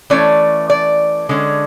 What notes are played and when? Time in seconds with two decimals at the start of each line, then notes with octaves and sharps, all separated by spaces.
0.10 E3 A3 C#4 D5
0.70 D5
1.29 D3 G#3 C#4